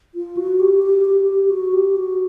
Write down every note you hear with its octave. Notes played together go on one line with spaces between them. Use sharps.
F4
F#4
G4
G4
G4
G4
F#4
G4
F#4